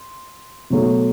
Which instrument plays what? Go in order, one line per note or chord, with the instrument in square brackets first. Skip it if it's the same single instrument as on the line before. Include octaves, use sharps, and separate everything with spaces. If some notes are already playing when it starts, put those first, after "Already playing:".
Already playing: [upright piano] C6
B2 F#3 A3